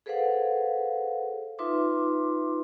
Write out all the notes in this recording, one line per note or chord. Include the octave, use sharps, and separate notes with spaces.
G#4 A4 B4 C5 F5 F#5
D#4 F4 B4 E5 C6 D6